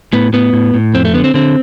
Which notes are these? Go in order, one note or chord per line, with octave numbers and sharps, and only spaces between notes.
A2 B3
A2 B3
A2
A2
F2 C4
A3
D3 B3
C4
D3 C4